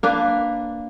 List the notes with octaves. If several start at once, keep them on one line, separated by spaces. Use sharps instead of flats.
A#3 D4 B4